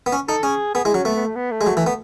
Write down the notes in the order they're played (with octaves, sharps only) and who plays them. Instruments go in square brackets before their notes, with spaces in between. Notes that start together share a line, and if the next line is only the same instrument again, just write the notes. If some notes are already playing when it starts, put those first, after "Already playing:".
[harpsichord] B3
C#4
[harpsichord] D#4 [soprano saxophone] A4
[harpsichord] C#4 [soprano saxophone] G#4
[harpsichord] B3 [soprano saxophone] G#4
[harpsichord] G#3 [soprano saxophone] E4
[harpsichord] F#3 [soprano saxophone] C#4
[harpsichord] A3 [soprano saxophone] B3
[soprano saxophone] B3
A3
B3
A3
[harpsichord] G#3
F#3
E3
B3